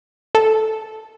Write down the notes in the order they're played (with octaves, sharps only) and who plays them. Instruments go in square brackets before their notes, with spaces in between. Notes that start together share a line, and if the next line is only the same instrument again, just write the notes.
[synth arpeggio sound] A4